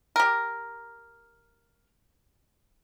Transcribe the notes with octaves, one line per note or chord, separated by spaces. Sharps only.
G4 A#4